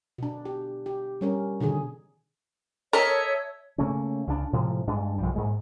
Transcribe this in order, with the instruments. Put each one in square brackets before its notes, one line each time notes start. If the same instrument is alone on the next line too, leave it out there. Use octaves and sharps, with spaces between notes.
[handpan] B2 D4
G4
G4
G3 C#4 A#4
B2 D3 D#3 G#4
[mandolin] A4 D#5 E5 [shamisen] A#4 [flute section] C#5
[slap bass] C#3 A3 A#3 C#4
C#2 C#3 D4
A2 C3 F3 G#3
G2 G#3 D4
B1 F3 G3
G#2 G#3 A#3